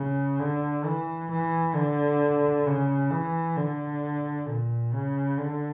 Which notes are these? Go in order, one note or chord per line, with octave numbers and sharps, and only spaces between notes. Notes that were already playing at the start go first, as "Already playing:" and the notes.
Already playing: C#3
D3
E3
E3
D3
C#3
E3
D3
A#2
C#3
D3